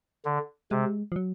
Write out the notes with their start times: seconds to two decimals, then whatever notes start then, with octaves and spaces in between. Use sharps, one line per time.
0.25 D3
0.71 C3 G#3
1.12 F3
1.16 F#3